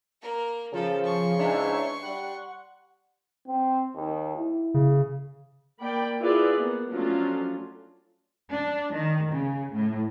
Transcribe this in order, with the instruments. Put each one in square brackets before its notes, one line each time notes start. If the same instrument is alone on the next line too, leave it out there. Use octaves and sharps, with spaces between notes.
[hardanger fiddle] A#3 A#4
[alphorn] C#3 [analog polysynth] F3 [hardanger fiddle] A4
[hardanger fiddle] C6 C#6
[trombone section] G#2 E3 D#4 [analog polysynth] D4 C#5 E5
[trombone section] G3 [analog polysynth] F#5
[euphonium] C4
D#2
E4
[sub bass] C#3
[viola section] A#3 D5 G5 B5
E4 F4 G#4 B4 D5
A#3 B3
F3 F#3 A3 C#4 D4 F4
[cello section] D4
D#3
C#3
A2